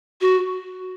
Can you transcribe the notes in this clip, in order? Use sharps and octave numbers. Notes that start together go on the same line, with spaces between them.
F#4